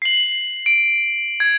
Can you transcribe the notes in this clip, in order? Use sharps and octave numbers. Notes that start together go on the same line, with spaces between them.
C7 F#7
D7
G#6